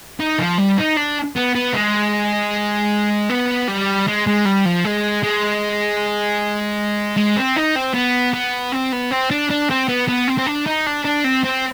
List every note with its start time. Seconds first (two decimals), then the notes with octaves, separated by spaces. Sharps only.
0.20 D#4
0.39 F3
0.58 G3
0.78 D#4
0.97 D4
1.36 B3
1.55 B3
1.74 G#3
3.30 B3
3.68 G3
4.08 G#3
4.27 G#3
4.45 G3
4.65 F3
4.84 G#3
5.23 G#3
7.17 G#3
7.37 C4
7.57 D#4
7.76 C4
7.94 B3
8.34 B3
8.72 C4
8.92 B3
9.11 C4
9.31 D4
9.50 D4
9.70 C4
9.89 B3
10.08 B3
10.28 C4
10.38 C4
10.46 D4
10.66 D#4
10.86 D4
11.05 D4
11.24 C4
11.44 C4